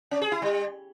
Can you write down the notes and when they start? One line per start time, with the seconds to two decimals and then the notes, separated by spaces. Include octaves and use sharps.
0.11 C#4
0.22 G#4
0.32 E4
0.42 G3